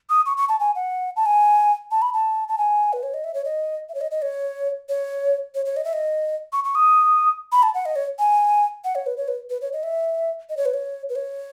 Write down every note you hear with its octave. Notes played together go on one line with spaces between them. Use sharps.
D#6
C#6
C#6
A5
G#5
F#5
A5
G#5
A5
B5
A5
A5
G#5
B4
C#5
D#5
E5
C#5
D#5
E5
C#5
D#5
D#5
C#5
C#5
C#5
C#5
D#5
E5
D#5
C#6
C#6
D#6
B5
A5
F#5
D#5
C#5
G#5
F#5
C#5
B4
C#5
B4
B4
C#5
D#5
E5
D#5
C#5
B4
C#5
B4
C#5